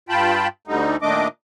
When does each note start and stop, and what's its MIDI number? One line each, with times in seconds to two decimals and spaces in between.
0.09 0.48 43
0.09 0.48 65
0.09 0.48 79
0.09 0.48 81
0.09 0.48 83
0.68 0.96 38
0.68 0.96 50
0.68 0.96 55
0.68 0.96 63
1.02 1.28 46
1.02 1.28 51
1.02 1.28 57
1.02 1.28 62
1.02 1.28 75
1.02 1.28 86